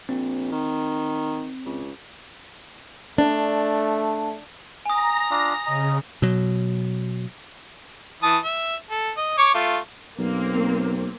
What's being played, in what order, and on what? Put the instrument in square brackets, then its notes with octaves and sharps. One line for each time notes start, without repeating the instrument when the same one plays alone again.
[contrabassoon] A#1 [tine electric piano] C4
[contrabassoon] D#3
C#2
[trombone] A3 [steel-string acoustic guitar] D4
[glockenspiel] G#5 D#6 [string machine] A#5 A#6
[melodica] D4 F4
[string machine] C#3 [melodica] D#5 A#5
[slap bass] B2 F#3
[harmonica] E3 A5 D#6
E5
A4
D#5
C#5 C#6 D6
A3 F4
[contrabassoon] B1 [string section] A#3 C4